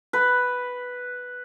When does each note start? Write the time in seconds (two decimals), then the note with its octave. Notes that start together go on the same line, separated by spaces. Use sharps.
0.13 B4